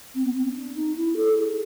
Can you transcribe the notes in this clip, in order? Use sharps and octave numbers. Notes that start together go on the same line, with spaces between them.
C4
B3
C4
C#4
D4
D#4
E4
A4
G#4